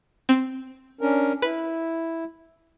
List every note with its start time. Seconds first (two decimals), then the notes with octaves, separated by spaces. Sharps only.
0.29 C4
1.01 C#4 D4 A#4
1.42 E4 B4